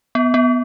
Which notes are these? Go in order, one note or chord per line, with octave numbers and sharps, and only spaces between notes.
B3
B3